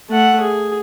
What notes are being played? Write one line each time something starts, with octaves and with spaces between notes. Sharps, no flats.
A3 F#5
G#4